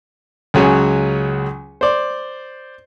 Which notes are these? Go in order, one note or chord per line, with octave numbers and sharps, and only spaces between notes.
C#2 C#3 F#3 C#5 G#5
C5 D5